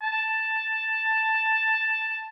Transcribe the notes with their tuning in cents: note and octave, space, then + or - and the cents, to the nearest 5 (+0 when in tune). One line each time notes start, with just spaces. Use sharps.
A5 +5